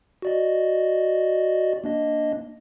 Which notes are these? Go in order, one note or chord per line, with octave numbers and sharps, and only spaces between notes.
F#4 D5 D#5
A#3 D4 D#5